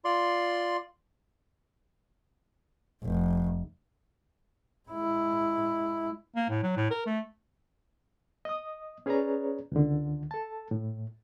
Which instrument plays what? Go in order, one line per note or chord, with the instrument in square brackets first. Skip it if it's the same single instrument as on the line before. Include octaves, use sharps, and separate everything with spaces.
[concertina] F4 D5 C6
[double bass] F1
G#3 E4
[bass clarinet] A#3
A2
F#3
A2
A#4
A3
[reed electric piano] D#5 D#6
C#4 G#4 B4 C#5 D5 A#5
C#2 D3
A4 A5
A2